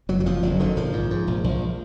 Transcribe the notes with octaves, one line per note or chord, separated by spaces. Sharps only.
F#1 F#3
F#3
F2 F3
F#1 F#3
D3 D#3
A#1 F3
G#2
G#2
A#1
A#1